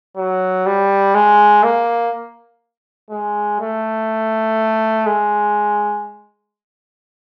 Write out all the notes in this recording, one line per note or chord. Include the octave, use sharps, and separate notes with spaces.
F#3
G3
G#3
A#3
G#3
A3
G#3